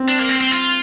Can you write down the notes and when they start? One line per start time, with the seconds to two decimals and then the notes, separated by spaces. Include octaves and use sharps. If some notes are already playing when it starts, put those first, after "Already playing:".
Already playing: C4
0.08 D4
0.19 A#3
0.30 C4
0.41 C4
0.52 F4